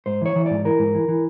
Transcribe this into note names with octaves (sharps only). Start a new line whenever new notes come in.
G#2 C5
E3 C#5
E3
G#2 D5
E3 A#4
G#2
E3
E3